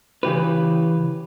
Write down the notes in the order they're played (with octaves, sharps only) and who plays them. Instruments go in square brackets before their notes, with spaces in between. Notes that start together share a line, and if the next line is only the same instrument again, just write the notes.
[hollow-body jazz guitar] C#3 E3 G4 B4